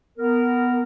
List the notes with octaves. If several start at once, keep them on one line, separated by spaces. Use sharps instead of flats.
B3 A#4